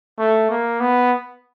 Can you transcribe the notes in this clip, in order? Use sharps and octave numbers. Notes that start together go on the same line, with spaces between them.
A3
A#3
B3